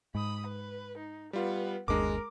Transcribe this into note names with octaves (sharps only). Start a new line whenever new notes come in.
G#2 B5 D#6
B4
D#4
G3 B3 F4 B4
G1 D#2 G#3 D4 A#4 D6